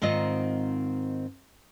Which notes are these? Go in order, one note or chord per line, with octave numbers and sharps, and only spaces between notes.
G#2 D#3 C4 F4 D#5